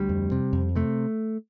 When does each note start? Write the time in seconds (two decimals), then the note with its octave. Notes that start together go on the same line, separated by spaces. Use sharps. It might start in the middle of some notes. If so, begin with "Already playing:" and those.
Already playing: D2 G3
0.09 F2
0.32 C3
0.53 F2
0.76 C3 A3